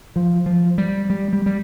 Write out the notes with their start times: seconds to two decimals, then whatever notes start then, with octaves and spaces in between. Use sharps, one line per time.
0.16 F3
0.46 F3
0.78 G3
1.10 G3
1.33 G3
1.46 G3